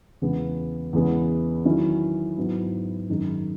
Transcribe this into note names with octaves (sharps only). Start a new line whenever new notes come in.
E2 C#3 G#3 B3
E2 C#3 G#3 B3
D#3 F#3 C#4 E4
G#2 F#3 B3 E4
F#2 D#3 G#3